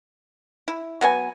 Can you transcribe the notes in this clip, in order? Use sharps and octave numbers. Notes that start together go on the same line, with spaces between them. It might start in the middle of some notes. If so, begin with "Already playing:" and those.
E4
F#3 B3 C5 G#5